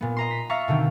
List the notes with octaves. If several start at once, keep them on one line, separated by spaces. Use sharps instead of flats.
A#2 B3
D#5 A#5 C6
B6
E5 F5 A#5 C#6 A6
B2 D3 D#3 C4